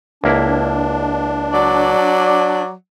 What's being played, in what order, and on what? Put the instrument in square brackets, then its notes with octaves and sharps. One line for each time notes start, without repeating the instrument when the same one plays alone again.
[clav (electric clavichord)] C#2 A#3 E4 [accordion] D4
[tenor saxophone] F#3 [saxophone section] D5